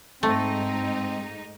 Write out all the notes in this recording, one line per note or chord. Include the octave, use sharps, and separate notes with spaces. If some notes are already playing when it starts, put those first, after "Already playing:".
G#2 A3 C4 D#4